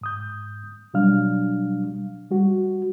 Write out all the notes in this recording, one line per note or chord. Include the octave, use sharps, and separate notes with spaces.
G#2 D#6 G6
B2 F#3 G3 D4 F5 F6
G3 F#4